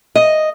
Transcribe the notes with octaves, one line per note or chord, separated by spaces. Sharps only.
D#5